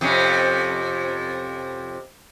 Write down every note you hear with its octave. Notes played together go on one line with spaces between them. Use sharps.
F2 C3 C#4